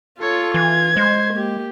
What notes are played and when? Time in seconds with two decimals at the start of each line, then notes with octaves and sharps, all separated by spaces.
0.20 F4 A4 C#5
0.54 E3 G#6
0.97 G#3 C5
1.33 A#3 G4